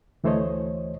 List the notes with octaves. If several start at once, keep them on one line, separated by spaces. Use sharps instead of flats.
D2 E3 A3 C5 C#5 D#5